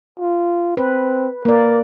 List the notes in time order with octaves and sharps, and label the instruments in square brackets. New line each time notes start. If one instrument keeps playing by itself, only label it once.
[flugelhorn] F4
[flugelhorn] C4 [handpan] B4
[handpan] A#3 D5 [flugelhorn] A#4